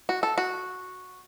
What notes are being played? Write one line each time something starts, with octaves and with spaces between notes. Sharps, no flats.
F#4
A4
F#4